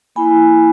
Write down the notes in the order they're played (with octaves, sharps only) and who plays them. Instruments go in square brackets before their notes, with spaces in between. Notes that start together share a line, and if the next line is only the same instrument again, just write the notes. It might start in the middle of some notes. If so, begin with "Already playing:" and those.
[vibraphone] A#3 E4 G#5 B5